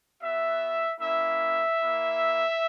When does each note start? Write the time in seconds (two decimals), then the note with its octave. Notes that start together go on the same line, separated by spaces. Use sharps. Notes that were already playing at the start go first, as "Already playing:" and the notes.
0.22 B3 F#4 E5
1.01 A#3 C#4 E4 E5
1.80 A#3 E4